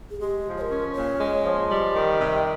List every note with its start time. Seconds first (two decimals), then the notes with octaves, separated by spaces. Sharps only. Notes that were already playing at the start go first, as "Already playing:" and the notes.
0.11 G#4
0.20 G#3 G4
0.45 F3
0.57 C#5
0.61 A#4
0.70 C#4
0.94 A#2 C#5
1.20 G#3
1.44 F3
1.70 G3 D#5
1.94 D#3
2.19 C3